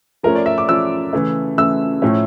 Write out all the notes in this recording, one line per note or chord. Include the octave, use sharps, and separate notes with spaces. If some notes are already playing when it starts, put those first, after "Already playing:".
F3 A3 C#4 A#4
D5
E5
D6
F3 A3 C#4 E6
C#3 E3 A3
C#3 E3 A3 E6
A2 F3 A3 C#4 E4